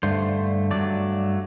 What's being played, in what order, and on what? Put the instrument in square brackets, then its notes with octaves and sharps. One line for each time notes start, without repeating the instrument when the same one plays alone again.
[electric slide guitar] G2 D3 A3 C5
G2 F#3 A3 D5